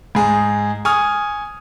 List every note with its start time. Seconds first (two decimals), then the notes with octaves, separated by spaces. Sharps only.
0.15 G#2 G#4
0.85 G#5 C#6 D#6 F6